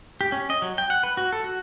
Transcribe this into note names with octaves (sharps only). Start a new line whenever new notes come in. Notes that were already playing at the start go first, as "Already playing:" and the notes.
G4
C#4
D#5
F#3
G5
F#5
B4
F#4
A4
F#4